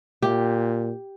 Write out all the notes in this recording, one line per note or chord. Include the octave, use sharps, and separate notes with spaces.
A#2 G4